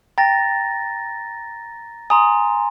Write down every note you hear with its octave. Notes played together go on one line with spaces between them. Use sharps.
G5 A#5 A6 A#6
G#5 A#5 C6 D#6